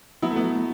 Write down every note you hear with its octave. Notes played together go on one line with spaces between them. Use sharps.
F#3 B3 E4
A3
B3
F#3
A3